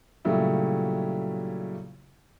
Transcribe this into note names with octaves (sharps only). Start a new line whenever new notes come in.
A#2 C#3 F#3 G3 A3 E4